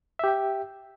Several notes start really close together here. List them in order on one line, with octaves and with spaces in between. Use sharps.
E5 G4 G5